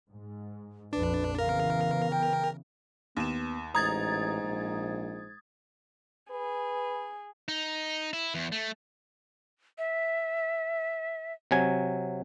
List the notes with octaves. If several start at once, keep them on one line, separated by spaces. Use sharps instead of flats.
G#2
A#1 F2 D4 B4
C#3 E3 B3 A#4 F5
G5
D#2 B3 E7
A1 G#2 A#5 D#6 G#6 A6
A#1
G#4 B4
D#4
E4
E2
A3
E5
C3 F#3 G#5